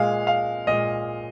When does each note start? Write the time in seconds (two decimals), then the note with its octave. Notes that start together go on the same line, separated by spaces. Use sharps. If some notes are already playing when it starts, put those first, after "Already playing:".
Already playing: A#2 G#3 F5
0.27 F5
0.67 A#2 G#3 D#5